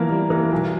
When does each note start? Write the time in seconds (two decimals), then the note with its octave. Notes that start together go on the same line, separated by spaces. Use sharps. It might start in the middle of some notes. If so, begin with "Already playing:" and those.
Already playing: E3 F3 A#3 B3 A#4
0.09 G3
0.30 E3
0.52 B1